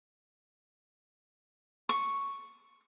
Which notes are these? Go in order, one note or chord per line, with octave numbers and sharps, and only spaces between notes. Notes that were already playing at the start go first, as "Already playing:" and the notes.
C#6